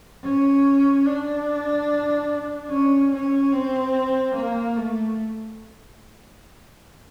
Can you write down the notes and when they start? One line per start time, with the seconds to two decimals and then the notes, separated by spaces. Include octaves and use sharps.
0.23 C#4
1.06 D4
2.70 C#4
3.11 C#4
3.52 C4
4.35 A#3
4.76 A3